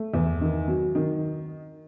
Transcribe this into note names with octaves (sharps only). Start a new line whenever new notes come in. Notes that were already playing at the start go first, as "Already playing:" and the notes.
Already playing: A3
E2
D#3
F#3
D#3